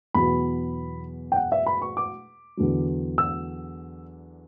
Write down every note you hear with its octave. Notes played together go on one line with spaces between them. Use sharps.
E2 B2 F#3 B5
G5
F#5
E5
B5
C#6
D6
E2 D3 F#3
E6